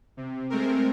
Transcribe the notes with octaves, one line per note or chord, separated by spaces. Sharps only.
C3
G#3 A3 C4 A#4